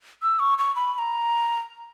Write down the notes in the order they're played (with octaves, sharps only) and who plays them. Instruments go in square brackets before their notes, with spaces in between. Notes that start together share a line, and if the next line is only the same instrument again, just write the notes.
[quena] E6
C#6
C#6
B5
B5
A#5